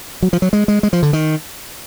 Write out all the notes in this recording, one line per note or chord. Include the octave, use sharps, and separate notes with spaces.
F#3
F3
F#3
G#3
G#3
G#3
F3
D3
D#3